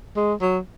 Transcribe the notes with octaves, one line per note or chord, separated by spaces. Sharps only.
G#3
F#3